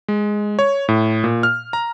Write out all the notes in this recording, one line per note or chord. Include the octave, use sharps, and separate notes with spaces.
G#3
C#5
A2
A#2
F6
A#5